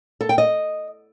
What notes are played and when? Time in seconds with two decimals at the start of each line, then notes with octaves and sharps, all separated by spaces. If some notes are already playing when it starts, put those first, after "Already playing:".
0.21 A4
0.29 G5
0.38 D#5